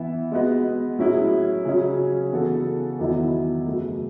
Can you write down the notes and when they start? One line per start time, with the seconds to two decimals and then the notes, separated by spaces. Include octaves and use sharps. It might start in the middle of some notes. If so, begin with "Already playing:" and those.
Already playing: E3 B3 E4 E5
0.32 G#3 B3 F#4 B4 D#5
0.99 A2 F#3 C#4 E4 G#4
1.65 C#3 F#3 C#4
2.32 C#3 E3 B3 F#4 A4
2.99 E2 D#3 F#3 B3 E4
3.67 F#2 C#3 F#3 A3